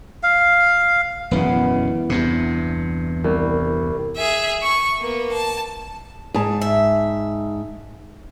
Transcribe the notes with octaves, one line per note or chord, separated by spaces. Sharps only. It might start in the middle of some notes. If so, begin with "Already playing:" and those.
F5
E1 F#2 C#3 E3 B3
E2 G2 C3
C2
G#4 E5
C#6
A#3 B3
A5
G#2 A5
E5